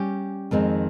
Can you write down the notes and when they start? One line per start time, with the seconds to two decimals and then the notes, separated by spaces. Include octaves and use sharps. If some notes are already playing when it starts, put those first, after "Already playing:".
Already playing: G3 C#4 G4
0.51 F2 D#3 G#3 C4